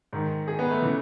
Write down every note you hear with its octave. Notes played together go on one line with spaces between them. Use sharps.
G#2 D#3
G#4
B3
A3
C#3 E3